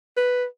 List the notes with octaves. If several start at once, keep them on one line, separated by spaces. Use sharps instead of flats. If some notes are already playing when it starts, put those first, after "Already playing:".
B4